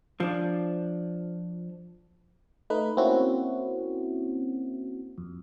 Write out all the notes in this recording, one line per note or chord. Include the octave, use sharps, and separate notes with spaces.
F3 D4
A3 D#4 B4
A#3 C4 C#4 E4 F#4
F2